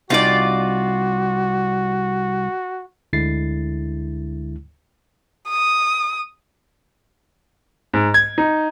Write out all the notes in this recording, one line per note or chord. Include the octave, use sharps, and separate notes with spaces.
C2 D#4 F4 F#4 D5
D2 D3 G#3 E4 A6 C7
D#6
G#2
G#6
D#4